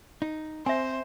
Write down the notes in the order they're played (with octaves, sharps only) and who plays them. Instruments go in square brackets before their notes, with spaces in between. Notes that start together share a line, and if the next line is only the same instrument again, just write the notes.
[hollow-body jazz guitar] D#4
[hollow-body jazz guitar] C4 [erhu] C5 [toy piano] E5 G#5